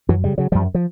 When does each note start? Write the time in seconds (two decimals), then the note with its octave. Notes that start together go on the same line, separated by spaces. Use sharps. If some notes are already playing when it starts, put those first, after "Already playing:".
0.09 F#2 E3 F#3
0.24 C#3 G3
0.38 C#3 F#3
0.52 F#2 F3 G3
0.75 F3